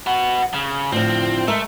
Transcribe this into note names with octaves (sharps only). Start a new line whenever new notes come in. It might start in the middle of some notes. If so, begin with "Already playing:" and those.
F#4 B4
C#3
A2 D3 F3 C4
G#3 A3 A#4 E5